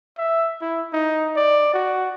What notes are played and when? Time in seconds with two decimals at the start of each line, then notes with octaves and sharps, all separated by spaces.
0.18 E5
0.62 E4
0.93 D#4
1.36 D5
1.74 F#4